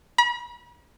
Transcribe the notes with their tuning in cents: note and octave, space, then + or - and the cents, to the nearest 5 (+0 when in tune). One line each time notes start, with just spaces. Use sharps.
B5 -45